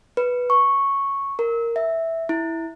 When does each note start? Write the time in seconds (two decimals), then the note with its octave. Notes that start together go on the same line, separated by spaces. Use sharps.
0.17 B4
0.50 C#6
1.39 A#4
1.76 E5
2.29 E4